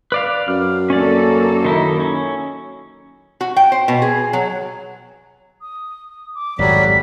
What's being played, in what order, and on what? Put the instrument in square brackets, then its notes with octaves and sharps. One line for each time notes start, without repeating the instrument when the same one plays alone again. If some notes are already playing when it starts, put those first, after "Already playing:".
[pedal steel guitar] B4 D5 F5
[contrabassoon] F#2 [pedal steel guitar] F6
[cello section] A#3 A4 [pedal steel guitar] C#4 D5
[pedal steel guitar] D#3 D#4 E4
C#4
[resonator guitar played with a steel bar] F#4
G5
C5
B2
G#4
F#3
[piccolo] D#6
D6
[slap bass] G#1 F2 [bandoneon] F#3 G3 [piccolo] B6